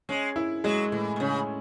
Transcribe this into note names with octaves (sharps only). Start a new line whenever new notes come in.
G#3 C#4
E4
F#3 G#3
A2 E3
B2
C#3 C#4